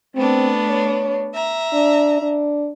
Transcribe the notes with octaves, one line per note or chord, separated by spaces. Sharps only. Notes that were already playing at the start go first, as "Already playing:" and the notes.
A3 B3 C4 D4
C#5
E5 A#5
D4
D4